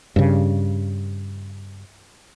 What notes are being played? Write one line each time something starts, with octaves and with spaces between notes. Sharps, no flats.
G2 C#3